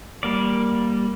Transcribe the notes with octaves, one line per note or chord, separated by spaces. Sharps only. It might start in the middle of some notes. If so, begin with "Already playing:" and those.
G3 A#3 D5